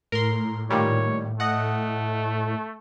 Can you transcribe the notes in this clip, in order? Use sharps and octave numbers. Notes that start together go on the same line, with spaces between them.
A2 A#4 C6
A#2 D#3 G3 C#5
A3 D#5 F#5